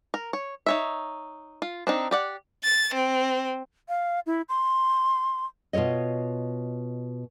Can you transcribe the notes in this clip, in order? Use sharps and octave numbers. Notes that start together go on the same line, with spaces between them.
A#4
C#5
D#4 C#5 E5
F4
C4 D4 D#4
G4 D5 F#5
A6
C4
F5
E4
C6
B2 F4 A4 C#5 D#5